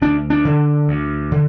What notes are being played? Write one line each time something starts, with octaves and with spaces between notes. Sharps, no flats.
D2 D4
D4
D3
D2
D3